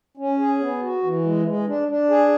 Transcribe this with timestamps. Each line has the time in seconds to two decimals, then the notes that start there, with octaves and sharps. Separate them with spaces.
0.17 C#4
0.39 G#4
0.60 B3
0.82 F#4
1.03 E3
1.24 G#3
1.46 G#3
1.67 D4
1.88 D4
2.10 G#4